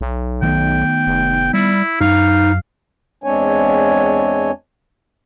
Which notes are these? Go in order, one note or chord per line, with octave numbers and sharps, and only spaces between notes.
B1
D#3 A3 B3 G5
F1
G3 E4
F#2 D#4 F5
E2 G#3 C4 D4 C#5 G#5